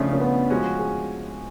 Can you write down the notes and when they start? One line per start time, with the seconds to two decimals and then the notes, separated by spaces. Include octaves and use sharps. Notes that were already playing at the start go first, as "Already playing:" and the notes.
Already playing: C#3 F3 A3 C#4 D4 F4
0.13 C#4
0.20 B3
0.50 F3 G#3 C#4 F#4
0.79 G#4